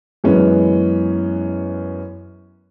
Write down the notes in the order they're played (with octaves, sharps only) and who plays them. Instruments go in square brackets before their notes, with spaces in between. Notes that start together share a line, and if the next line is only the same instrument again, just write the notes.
[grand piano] F#2 E3 G#3 B3 C#4